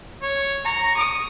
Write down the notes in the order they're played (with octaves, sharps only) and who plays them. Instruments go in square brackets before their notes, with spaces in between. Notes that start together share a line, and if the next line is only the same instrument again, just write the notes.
[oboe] C#5
[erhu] A#5 [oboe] C#6
[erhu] D#6